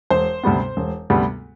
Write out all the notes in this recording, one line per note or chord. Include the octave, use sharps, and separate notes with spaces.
E1 C5
D2 C3 G3 B3
E1
D2 C3 G3 B3